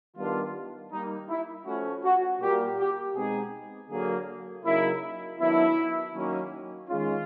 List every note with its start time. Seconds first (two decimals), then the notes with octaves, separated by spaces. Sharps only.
0.17 D#3 G3 B3 D4 F4
0.92 D#3 G3 A#3 D#4
1.29 E4
1.66 F3 A3 C#4 F#4
2.04 F#4
2.41 A#2 G3 A#3 G4
2.79 G4
3.16 B2 G#3 C4 D#4 G#4
3.91 D3 F#3 A#3 G#4
4.65 C#3 F#3 A#3 D#4 E4
5.40 D#3 F#3 B3 D4 E4
6.15 D#3 F#3 A#3 C#4
6.89 D#3 G#3 C#4 F4